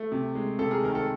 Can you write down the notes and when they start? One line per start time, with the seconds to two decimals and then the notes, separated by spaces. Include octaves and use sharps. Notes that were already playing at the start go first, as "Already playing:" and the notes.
Already playing: A3
0.12 C3
0.35 G#3
0.59 C3 A4
0.71 G#4 A#4
0.83 D#3 A#4
0.95 A4